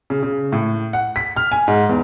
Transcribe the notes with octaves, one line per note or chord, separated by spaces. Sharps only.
C#3
C#3
A2
F#5
B6
F6
G#5
G#2
E2